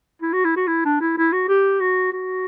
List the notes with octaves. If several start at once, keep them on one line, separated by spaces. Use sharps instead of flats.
E4
F#4
E4
F#4
E4
D4
E4
E4
F#4
G4
F#4
F#4